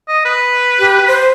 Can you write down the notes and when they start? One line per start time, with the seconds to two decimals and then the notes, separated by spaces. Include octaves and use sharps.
0.08 D#5
0.25 B4
0.79 G4
1.07 C5